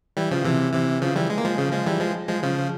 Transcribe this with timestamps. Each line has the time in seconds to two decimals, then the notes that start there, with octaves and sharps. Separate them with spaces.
0.17 E3 G3
0.31 C#3 F3
0.45 C3 E3
0.73 C3 E3
1.02 C#3 F3
1.16 E3 G3
1.30 G#3
1.38 A#3
1.45 F3 G#3
1.58 C#3 F3
1.73 F3 G#3
1.86 E3 G3
2.00 F3 G#3
2.28 F3 G#3
2.43 C#3 F3